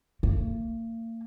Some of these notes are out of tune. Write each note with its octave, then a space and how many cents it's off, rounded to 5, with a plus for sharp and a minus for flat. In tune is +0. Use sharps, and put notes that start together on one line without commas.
A#3 -40